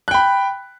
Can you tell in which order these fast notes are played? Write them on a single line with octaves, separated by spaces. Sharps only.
F#6 G5 B5